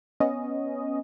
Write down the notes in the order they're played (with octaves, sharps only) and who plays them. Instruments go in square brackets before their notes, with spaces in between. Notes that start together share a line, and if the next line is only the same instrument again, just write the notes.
[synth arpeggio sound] B3 C#4 D#5